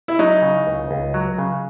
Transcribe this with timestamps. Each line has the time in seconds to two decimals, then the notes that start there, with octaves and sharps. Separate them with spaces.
0.08 E4
0.19 F#3 D#4
0.42 C#3
0.67 C#2
0.91 C#2
1.14 F#3
1.38 C#3